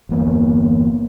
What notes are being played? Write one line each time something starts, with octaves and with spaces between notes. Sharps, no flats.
G1 E2 A#3 B3